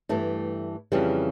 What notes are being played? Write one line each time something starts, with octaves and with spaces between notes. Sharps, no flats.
G2 E3 A3
F2 C#3 E3 G3